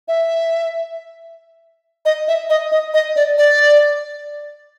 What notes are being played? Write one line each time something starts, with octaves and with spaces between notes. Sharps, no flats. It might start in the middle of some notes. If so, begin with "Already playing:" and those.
E5
D#5
E5
D#5
D#5
D#5
D5
D5